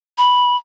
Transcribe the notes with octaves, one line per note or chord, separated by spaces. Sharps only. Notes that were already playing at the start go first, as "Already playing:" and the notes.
B5